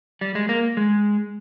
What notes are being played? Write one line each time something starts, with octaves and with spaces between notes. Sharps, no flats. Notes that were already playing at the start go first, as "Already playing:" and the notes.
G3
G#3
A#3
G#3